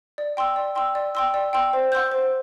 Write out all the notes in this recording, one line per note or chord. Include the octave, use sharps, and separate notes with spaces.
D5
G5 C6 E6
D5
G5 C6 E6
D5
G5 C6 E6
D5
G5 C6 E6
C5
F#5 C6 E6 G6
C5